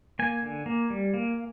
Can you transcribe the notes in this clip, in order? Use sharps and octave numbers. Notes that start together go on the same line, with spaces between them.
A#3 G#5
D3
A#3
G3
A#3